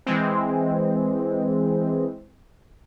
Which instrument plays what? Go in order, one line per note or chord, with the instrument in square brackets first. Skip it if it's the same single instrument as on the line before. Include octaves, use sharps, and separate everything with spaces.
[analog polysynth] E3 G#3 C4